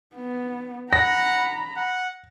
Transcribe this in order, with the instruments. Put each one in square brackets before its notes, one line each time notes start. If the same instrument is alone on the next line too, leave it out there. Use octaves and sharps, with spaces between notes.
[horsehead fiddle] B3
[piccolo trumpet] F#5 [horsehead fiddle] A#5 B5 [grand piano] A#6
[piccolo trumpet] F#5